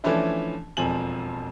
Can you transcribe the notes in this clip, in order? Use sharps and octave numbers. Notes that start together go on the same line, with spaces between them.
E3 F3 A3 C#4 D4 E4
E1 F2 F3 G#5 F#7